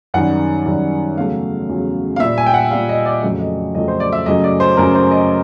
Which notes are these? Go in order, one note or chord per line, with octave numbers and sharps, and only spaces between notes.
F#2 D#3 G3 F#5
F#2 D#3 G3
E2 C#3 F#3 A3 F5
E2 C#3 F#3 A3
F5
A#2 G3 E5
G#5
G5
F#5
A#2 G3 F5
D#5
D5
F2 C#3 F#3 A3
D#5
F2 C#3 F#3 A3 D#5
C5
D5
E5
F#2 C#3 F#3 A3 D#5
D5
C5
F#2 C#3 F#3 A3 A#4
C5
D#5